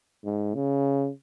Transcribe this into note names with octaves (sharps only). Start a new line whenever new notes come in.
G#2
C#3